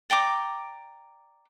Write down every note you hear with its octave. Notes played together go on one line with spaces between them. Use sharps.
D5 G5 A#5 D6